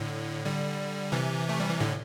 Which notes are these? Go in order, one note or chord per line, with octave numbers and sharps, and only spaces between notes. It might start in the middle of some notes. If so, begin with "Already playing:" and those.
Already playing: A2 D3
D3 G3
C3 E3
A3
G3
E3
A2 D3